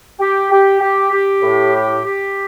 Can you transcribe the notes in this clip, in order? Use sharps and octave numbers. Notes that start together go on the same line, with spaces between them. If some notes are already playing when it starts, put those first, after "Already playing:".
G4
G4
G4
G4
A2
G4
G4